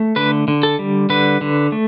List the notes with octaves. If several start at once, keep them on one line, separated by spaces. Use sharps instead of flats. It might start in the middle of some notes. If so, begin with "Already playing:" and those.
Already playing: A3
D3 B4
D3
A4
G3
D3 B4
D3
A3